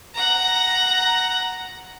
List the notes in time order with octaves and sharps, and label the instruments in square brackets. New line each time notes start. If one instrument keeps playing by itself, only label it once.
[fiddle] F#5 A#5